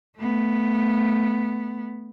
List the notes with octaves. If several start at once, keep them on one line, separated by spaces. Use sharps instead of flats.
A3 B3